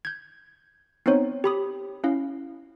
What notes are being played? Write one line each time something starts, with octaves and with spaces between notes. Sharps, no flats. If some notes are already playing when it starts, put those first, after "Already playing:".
G6 G#6
B3 C4 D#4 C5 C#5
G4 B5 D#6
C#4 E4 F5